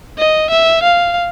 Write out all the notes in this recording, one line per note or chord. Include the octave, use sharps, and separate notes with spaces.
D#5
E5
F5